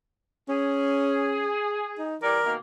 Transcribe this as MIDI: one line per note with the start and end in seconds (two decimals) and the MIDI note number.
0.49 1.54 61
0.49 2.15 68
1.99 2.17 63
2.22 2.39 52
2.22 2.39 55
2.22 2.53 70
2.22 2.39 74
2.45 2.56 47
2.45 2.56 51
2.45 2.56 58